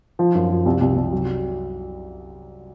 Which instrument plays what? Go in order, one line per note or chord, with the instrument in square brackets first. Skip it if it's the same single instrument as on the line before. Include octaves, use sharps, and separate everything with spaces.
[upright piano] F3
F#2
F3
C2
C2
C2
F#3